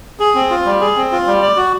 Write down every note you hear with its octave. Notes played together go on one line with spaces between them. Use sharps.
G#4
C4
F4
G3
G#4
C4
F4
G3
D5
F#4